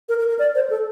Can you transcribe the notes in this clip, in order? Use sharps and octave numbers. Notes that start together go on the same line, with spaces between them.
A#4
A#4
A#4
D5
C5
A4